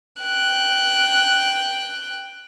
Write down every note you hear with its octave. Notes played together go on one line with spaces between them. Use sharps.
G5 F#6